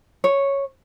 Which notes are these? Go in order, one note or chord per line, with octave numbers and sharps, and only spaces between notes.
C#5